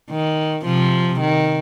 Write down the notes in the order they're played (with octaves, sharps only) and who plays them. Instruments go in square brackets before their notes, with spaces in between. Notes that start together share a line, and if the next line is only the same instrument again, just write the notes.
[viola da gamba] D#3
C3 F3
D#3